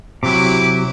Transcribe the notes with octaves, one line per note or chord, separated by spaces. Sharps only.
C3 F#3 E4 G4 D6